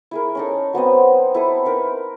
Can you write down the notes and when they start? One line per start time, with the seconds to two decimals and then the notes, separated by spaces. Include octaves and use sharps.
0.11 E4 G#4 A#4
0.35 C#4 D#4 A4
0.73 F#3 B3 C4 D#5
1.35 E4 A4 D#6
1.66 D#4 A#4 B4